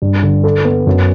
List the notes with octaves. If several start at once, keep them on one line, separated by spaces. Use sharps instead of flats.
G2
D3
A4
B3
F#2